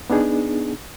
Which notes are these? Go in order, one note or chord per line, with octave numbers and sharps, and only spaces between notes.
B3 D4 D#4 G#4